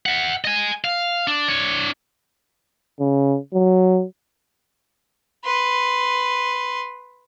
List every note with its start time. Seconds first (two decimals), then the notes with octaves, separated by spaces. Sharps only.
0.06 E5 F#5
0.45 D#5 G#5
0.84 F5
1.28 D4
1.48 D4 C#5
3.00 C#3
3.54 F#3
5.45 B4 C6